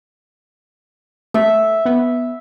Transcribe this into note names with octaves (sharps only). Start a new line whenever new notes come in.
A3 E5
B3